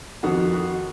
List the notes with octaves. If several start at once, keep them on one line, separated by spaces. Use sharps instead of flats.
F2 D#3 F#4
F#4